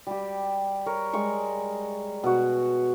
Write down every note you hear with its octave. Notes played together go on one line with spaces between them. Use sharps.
G3 G4
A#4 C#5
G3 G#3 C#6
B2 F#4